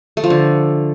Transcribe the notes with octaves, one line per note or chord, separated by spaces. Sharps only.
A3
F3
D3